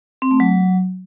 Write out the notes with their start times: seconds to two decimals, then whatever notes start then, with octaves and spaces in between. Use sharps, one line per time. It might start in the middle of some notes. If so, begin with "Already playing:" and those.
0.22 C4
0.31 A3
0.40 F#3